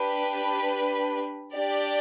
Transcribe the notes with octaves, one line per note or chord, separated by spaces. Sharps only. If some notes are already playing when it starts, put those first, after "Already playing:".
Already playing: D4 G4 B4
D4 G4 D5